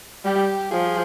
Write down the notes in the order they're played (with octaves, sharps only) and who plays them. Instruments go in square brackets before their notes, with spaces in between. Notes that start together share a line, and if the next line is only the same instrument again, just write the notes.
[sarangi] G3 [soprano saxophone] G4
[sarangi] F3 [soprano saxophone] G#4